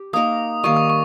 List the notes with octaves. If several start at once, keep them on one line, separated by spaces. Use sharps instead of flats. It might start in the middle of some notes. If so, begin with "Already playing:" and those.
Already playing: G4
A#3 D#4 A#4 D#6
D#3 G3 A#3 C#6
D#6
C#6